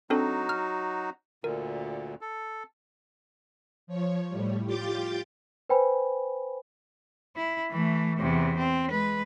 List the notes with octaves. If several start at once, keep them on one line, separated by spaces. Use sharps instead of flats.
F#3 C4 D4 D#4 F#4 A4
F6
D2 A#2 D3 A#4
A4
F3 C#5
A2 G3
F4 G4 D6 G6 A6
B4 C5 G5 G#5 B5
E4
E3 A3
E2 C3
C4
G#3 B4